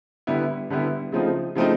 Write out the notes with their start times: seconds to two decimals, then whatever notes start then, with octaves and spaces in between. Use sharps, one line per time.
0.27 D3 G3 B3 E4
0.70 D3 G3 B3 E4
1.12 C#3 F3 A3 C4 D#4
1.55 C#3 F3 A3 C4 D#4